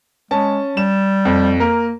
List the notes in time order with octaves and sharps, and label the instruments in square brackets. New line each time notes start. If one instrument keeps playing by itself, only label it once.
[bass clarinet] G#3 [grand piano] C#4 A5
[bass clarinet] G3 [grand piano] E7
[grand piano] F2
[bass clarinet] A#3 [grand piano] A#4